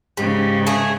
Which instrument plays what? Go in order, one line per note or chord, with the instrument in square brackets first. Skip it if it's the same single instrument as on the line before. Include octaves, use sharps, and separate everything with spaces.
[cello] G#2 C#3 [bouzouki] G3
[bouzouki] A3 G#4